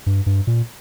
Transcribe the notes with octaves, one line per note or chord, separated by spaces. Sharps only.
G2
G2
A#2